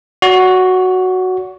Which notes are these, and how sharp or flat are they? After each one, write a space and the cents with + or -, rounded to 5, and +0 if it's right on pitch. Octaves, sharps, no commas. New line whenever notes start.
F#4 +0 D5 -45